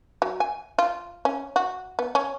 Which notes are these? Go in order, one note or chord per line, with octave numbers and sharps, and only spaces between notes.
F#3
G#5
F4
C#4
F#4
B3
C#4